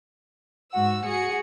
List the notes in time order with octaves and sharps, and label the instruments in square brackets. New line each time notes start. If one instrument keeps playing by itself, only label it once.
[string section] G#2 F#4 E6 [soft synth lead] F#5
[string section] F#4 G#4 C#7